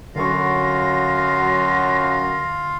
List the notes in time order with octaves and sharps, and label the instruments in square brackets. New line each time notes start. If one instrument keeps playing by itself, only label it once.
[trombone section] F#2 F#3 [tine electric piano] D3 C#6 [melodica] F4 F5 [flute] A#6